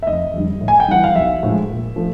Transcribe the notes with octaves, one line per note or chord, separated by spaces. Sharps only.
E5
F1 D#5
F2 D3 G3
A2
G#5
G5
E3 G3 F#5
F5
B1 E5
A2 F3 G#3
A#2
F3 A3